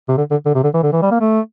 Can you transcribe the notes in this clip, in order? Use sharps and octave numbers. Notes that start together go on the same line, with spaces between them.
C3
D3
D3
D3
C3
D3
E3
D3
E3
G3
A#3
A3